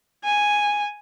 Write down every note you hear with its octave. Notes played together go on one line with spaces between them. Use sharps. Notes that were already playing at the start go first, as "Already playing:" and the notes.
G#5